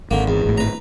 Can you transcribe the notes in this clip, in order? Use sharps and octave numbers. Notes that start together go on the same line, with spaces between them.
G#1 D3 A#3
E2
G#1 A2
B4 A#5